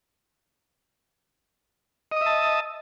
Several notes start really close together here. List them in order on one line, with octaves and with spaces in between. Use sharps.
D#5 D#6 E5 A5